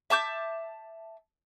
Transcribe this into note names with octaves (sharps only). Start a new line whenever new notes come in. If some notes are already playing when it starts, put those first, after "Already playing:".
E5 A5 D6 G6